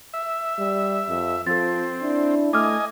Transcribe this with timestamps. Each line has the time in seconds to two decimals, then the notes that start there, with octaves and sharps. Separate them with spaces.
0.14 E5
0.59 G3
1.09 F2
1.47 F3 C4 A4 A6
2.01 D4 E4
2.53 A3 D#5 G#5 D6 F6